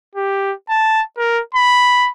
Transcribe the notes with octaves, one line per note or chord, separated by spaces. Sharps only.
G4
A5
A#4
B5